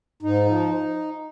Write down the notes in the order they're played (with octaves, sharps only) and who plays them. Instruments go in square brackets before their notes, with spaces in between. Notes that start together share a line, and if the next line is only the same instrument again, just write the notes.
[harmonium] G#2 D#4
F3